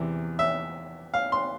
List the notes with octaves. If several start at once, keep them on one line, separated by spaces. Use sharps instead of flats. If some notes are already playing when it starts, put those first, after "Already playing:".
Already playing: E2 C3 E3
E5
F5
C6